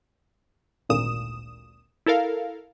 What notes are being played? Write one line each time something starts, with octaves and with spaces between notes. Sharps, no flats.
G#1 D2 A#2 D#6 E7
E4 A4 A#4 F5